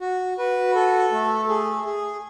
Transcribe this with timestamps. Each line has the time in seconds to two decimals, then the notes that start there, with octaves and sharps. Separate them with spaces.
0.01 F#4
0.38 F#4 B4
0.75 A4
1.12 A3
1.49 G#4
1.85 G#4